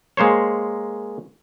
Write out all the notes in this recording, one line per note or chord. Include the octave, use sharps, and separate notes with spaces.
G#3 A#3 C5 C#5